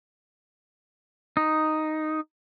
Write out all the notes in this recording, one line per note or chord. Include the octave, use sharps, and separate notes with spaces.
D#4